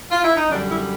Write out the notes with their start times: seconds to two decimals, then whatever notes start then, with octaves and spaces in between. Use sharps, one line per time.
0.11 F4
0.24 E4
0.37 D#4
0.50 F#2 D3 G3 D4
0.69 E4